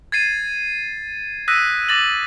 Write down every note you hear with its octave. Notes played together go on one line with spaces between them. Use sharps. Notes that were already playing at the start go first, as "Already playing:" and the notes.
G#6 A6 C7 D#7
D#6 E6 F#6 A#6 B6 D#7
D6 A6 A#6 F#7